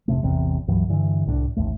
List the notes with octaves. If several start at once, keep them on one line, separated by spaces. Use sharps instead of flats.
F1 C3 A3
A1 E2 C3
C#2 G2 E3 F#3
G2 D3 E3
C2 A2 G#3 D4
A1 D#2 A3